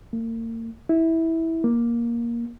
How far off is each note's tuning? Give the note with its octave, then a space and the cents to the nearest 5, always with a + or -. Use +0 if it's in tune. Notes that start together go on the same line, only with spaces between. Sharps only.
A#3 -40
E4 -15
A#3 +10